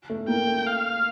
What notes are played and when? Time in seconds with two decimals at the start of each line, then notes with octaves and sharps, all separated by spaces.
0.10 A3
0.28 A#3 G5
0.47 A3
0.67 F5